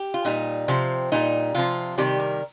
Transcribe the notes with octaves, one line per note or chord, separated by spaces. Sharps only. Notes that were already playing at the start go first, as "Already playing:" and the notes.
Already playing: G4
F4
A#2 G3 D#4
C3 F3 C4
A#2 G3 D#4
C3 F3 F4
C3 D#3 G3 G4
A#4